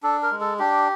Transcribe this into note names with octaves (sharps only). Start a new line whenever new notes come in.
D4 A4
A#4
G#3
A4
D4 G4